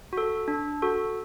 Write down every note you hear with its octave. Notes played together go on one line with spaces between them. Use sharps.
F#4 A4
D4
F#4 A4